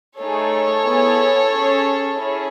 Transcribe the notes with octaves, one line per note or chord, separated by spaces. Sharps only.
A3 D#4 G#4 A4 C#5
B3 E4 G#4
C#4 G#4
C#4 E4 G#4